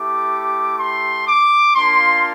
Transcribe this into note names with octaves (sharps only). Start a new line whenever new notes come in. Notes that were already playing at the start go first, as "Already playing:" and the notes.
Already playing: A3 E4 G4 D6
C6
D6
A#3 D4 F4 C6